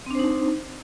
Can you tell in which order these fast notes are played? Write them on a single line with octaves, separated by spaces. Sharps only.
C4 D4 C5 D#4